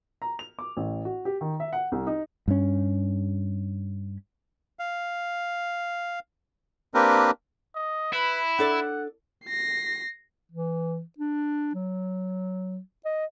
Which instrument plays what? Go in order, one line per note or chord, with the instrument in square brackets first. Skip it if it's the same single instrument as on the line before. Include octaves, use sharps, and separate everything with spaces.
[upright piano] A#5
F7
D6
A1
F#4
G4
D#3
E5
F#5
C2
D#4
[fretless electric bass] G2 C#4
[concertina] F5
A#3 C4 D4 G4 A#4 B4
[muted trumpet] D#5
[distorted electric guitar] E4 [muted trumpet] B4
[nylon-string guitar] D4 A4 D5 [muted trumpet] F#5
[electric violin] A#6 C7
[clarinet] E3
D4
F#3
D#5